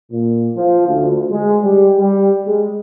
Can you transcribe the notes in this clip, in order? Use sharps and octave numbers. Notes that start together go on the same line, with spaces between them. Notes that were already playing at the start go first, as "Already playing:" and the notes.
A#2
F3
D2
G#3
G3
G3
G#3